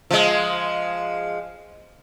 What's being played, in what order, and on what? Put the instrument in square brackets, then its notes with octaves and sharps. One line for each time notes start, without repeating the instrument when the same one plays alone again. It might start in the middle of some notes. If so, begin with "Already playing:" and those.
[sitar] F3 G#3